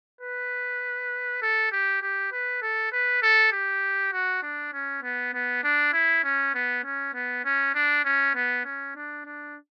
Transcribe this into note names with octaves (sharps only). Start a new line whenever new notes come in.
B4
A4
G4
G4
B4
A4
B4
A4
G4
F#4
D4
C#4
B3
B3
D4
E4
C#4
B3
C#4
B3
C#4
D4
C#4
B3
C#4
D4
D4